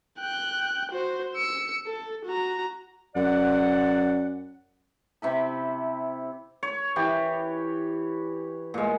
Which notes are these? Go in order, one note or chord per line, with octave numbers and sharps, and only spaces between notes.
G5 F#6
F#4 C5
E6 C#7
A4
F#4 A#5
F#2 D5 F#5
C3 E4 B5
C#5
E3 G4
A#2 G#3